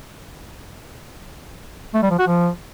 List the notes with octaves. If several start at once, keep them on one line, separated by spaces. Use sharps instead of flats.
A3
G3
F3
F#4
F3